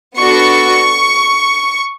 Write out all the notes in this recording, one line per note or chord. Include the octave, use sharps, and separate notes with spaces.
B3 D4 F#4 A4 C#6